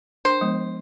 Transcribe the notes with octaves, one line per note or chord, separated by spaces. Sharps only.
D4 A#4 C5 G5
F3 G#3 B3